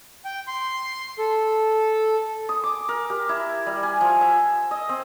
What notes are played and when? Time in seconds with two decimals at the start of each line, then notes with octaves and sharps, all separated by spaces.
0.25 G5
0.47 C6
1.18 A4
2.49 D#6
2.64 D6
2.89 A#4
3.10 G4
3.29 E4
3.66 G3
3.83 G#5
4.01 F3
4.21 E5
4.71 D#5
4.89 C4